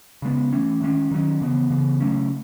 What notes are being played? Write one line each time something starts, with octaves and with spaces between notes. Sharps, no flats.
C#3 G#3 B3
E3 A3 C#4
D#3 G#3 C#4
D#3 F#3 C#4
C#3 E3 B3
C#3 E3 B3
C#3 F#3 A3 C#4